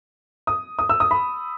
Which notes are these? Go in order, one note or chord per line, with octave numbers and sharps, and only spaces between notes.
D#6
D#6
E6
D#6
B5